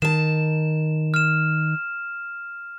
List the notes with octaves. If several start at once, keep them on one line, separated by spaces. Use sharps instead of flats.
D#3 A5 E7
F6 E7